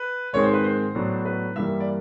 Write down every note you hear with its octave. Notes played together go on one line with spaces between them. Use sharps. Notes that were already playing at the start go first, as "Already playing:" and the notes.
Already playing: B4
G#2 D#3 G#3 C4 C#5
C5
B4
C5
A2 F#3 B3 D4
B4
G2 E3 G3 A#3 E5
D5